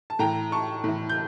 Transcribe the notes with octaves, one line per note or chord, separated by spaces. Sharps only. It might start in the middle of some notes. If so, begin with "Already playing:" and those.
A5
A2 E3 G5 A#5
A5 C#6
A2 E3
G6